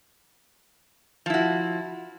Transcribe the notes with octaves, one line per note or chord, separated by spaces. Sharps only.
F3 E4 F#4